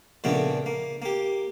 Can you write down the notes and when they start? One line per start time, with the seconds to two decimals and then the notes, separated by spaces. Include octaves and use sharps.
0.24 F2 A#2 C#3 A3 B3 D4
0.66 A#3
1.02 A#3 G4